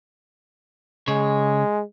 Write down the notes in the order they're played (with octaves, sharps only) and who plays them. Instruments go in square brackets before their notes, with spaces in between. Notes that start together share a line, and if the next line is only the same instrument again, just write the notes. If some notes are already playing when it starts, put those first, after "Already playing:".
[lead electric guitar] C#3 C#5 [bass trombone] G#3